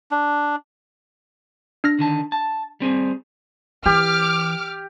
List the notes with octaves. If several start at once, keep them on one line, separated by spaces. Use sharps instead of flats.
D4
D4 F6 A#6
D3 D#3 A5
A5
G3 C4 G#4
E3 G4 D6 F6